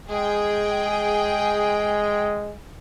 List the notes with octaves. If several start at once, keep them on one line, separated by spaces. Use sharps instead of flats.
G#3 G#4 G5